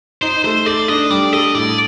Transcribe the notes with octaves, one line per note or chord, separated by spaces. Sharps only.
D#4 C5
A3 C5
A4 D5
D4 D#5
G3 D5
A4 D#5
A2 D5